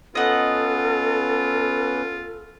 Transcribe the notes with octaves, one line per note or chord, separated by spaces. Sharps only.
B3 C#4 F4 A4 B4 D#5 F#5